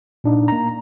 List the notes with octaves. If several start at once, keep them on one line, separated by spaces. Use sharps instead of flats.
A#2 D4 D#4
A#3 A#5